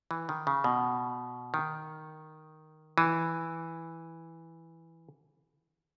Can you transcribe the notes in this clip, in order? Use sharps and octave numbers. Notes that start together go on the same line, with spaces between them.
E3
D#3
C#3
B2
D#3
E3